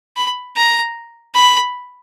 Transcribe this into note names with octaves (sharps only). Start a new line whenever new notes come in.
B5
A#5
B5